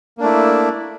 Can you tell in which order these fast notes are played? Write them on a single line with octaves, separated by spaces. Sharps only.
A#3 D4 A3 E4